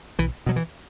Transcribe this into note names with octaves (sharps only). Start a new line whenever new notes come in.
B1 E3
B2 F#3
E3